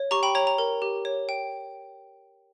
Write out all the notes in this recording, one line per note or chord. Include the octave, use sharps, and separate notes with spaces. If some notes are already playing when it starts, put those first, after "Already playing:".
Already playing: C#5
G4 A#5 C#6
G5 B5
C#5 A#5
A#5
A#4
G4
C#5
G5